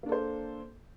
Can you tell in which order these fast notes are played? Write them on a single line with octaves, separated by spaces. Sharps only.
A#3 D4 A4 C5